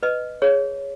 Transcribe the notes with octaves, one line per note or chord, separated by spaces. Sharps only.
B4 D#5
G#4 C#5